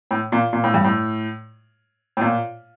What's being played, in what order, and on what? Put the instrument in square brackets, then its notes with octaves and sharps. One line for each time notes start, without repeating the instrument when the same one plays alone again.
[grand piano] A2
A#2
A#2
A2
G2
A2
A2
A#2